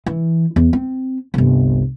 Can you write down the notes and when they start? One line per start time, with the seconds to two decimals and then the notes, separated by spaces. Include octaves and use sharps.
0.06 E3
0.56 E2
0.73 C4
1.34 G1 C2